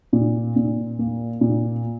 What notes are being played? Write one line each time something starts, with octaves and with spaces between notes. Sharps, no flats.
A#2
A#2
A#3
A#2